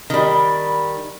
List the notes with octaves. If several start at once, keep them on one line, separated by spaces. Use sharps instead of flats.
D#3 G3